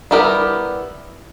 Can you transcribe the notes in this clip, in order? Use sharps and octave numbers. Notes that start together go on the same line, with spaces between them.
G3 B3 E4 G4 A#4